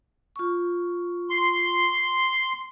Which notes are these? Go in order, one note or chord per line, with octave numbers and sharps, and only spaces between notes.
F4 C#6
C6